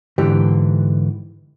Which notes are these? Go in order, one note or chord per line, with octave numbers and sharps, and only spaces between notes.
G#2 D3 E3 G4